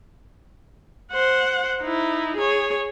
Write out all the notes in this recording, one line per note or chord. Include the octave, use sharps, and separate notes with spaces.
C5 F#5
D#4 E4
G#4 C#5